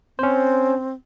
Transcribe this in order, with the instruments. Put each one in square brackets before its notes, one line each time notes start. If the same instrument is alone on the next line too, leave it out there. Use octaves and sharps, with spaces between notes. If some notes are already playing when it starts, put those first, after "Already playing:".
[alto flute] C4 [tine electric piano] C#4 C5